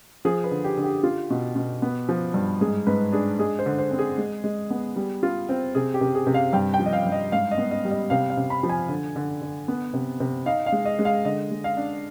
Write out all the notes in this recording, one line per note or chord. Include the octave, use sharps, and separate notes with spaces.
F3 G#4
B4
D3
G4
D3
G4
F4
B2
B2
B3
F3
G2
G#2 G#4
G#2 B4
D4 G#4
G#3 G#4
C5
D3
C5
C4
G#4
G#3
G#3
B3
G3
F4
C4
C3 G#4
G4
C3
G#4
C3
F5
G2 G5
G5
F3
D#5
F5
G2
D#5
G#2 F5
D#5
B3
D#5
G3
D#5
C3 F5
F5
C3
B5
F3
G#5
D3
D3
D3
B3
C3
C3
D#4 F5
F5
G#3
D#5
G#3
F5
D3 D#5
G#3
F5
D4